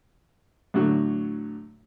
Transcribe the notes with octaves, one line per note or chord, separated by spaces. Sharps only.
A2 D3 F#3 F#4